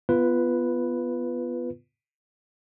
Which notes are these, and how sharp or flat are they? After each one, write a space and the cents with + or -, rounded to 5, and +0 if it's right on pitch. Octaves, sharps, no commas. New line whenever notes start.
B3 +0 F4 -20 B4 +0